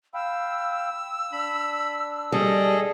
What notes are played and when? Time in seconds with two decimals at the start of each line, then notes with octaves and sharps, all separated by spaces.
0.14 F5 G5 B5 E6
1.32 D4 B5
2.32 G3 G#4 A4 D#5